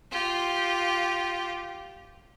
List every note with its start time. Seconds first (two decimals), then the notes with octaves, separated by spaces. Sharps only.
0.11 F4 G4